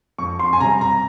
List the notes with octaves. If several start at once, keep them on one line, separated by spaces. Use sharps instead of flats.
F2 C#6
C6
G#5
C3 G3 A#5
A#5